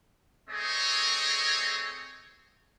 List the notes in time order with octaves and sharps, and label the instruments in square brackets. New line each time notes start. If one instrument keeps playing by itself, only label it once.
[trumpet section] A3 C4 G#4 C#5 D#5